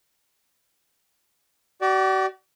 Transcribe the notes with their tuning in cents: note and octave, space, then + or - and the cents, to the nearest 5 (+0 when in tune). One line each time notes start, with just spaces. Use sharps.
F#4 +45 D5 +0